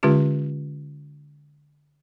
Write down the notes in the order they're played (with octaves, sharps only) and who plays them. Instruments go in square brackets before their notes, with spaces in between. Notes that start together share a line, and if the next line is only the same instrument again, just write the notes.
[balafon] D3 G#3 C#4 F4 G4